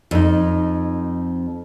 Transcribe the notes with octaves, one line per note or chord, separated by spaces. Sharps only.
F2 D#4